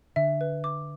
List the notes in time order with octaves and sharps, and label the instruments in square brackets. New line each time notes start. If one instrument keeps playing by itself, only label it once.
[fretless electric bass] D3 [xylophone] E5
[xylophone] B4
D6